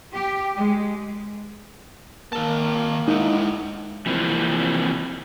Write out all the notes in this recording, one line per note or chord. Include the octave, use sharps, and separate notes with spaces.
G4
G#3
D#3 A#3 A#4 A5
G#3 D#4 E4 F#5
C3 E3 F3 A#3 C4